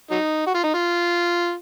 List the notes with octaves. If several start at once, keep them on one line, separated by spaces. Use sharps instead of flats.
F#3 D#4
F#4
F4
D#4
F4